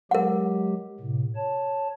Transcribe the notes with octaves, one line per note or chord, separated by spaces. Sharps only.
F#3 G#3 G4 A#4 F#5
A2 C3
C#5 A5